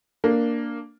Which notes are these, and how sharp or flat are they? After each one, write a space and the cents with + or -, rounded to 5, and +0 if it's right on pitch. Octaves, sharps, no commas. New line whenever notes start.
A#3 +0 D4 +0